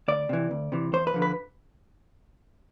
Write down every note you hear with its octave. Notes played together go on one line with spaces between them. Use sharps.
D2 D5
C3 E3
D2
C3 E3
E2 C5
B4
D3 F3
B4